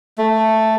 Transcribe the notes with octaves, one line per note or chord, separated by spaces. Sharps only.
A3